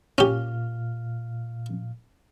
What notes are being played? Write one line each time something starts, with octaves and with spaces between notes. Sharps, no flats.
A#2 C#4 G4 F5 F6